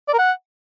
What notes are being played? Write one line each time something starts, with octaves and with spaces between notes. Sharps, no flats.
D5
A#4
F#5